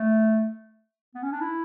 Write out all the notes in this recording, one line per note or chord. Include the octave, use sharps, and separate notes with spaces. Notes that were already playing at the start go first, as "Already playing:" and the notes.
Already playing: A3
B3
C#4
D4
E4